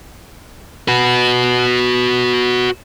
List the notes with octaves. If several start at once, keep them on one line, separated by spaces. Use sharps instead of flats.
F#4 B4